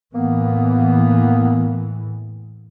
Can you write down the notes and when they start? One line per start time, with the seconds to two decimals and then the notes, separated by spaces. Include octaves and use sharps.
0.15 A2 E3 A#3 B3